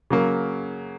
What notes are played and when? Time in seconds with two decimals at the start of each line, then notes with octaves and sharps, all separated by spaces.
0.10 C#3 F#3 A#3